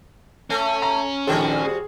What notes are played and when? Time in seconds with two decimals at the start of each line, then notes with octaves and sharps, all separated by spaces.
0.50 A3 C#4
0.82 A#5
1.27 A#1 D#3 G3 F#4 A4 C5
1.64 G#4